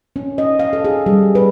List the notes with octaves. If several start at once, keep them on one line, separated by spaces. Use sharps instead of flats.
C#4
D#5
F5
A4
G#4
G3
B4